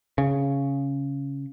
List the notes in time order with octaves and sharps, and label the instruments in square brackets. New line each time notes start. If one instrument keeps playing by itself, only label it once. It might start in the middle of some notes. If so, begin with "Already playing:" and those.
[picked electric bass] C#3